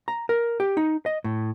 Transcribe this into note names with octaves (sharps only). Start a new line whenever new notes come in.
A#5
A#4
G4
D#4
D#5
A2